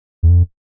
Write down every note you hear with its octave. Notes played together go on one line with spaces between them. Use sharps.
E2
F2